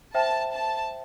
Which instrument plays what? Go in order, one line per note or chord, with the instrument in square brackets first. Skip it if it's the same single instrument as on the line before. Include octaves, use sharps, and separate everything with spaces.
[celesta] C5 E5 G5 [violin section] A5
[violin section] A5